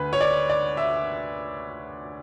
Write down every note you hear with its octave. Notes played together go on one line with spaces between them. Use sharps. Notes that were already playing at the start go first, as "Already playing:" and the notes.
Already playing: D2 D3 B4
C#5
D5
D5
E5